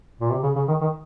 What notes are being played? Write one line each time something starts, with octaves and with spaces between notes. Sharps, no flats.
A#2
C3
C#3
C#3
D#3
D#3